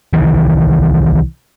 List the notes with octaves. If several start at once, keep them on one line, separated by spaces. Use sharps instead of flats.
C2 D#3 E3